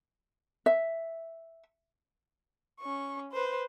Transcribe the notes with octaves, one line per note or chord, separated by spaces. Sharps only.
E5
C#4 C#6
B4 C5